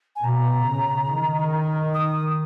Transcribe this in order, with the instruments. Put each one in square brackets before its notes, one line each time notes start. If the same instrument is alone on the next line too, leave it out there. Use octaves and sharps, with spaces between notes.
[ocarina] G#5
[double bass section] B2 [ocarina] A#5
[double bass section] C#3
D#3
[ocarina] D#6